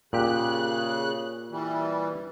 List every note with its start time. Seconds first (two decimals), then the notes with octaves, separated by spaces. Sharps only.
0.13 A#2 C#3 G4 F#6
1.51 E3 G3